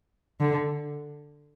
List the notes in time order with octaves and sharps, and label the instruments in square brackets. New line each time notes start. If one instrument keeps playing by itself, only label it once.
[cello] D3